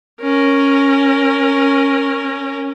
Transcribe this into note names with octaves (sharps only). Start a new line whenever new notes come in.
C#4 A#4